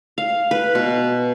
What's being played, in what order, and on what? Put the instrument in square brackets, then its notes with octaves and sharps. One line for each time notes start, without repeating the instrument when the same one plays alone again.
[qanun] F5
B4
B2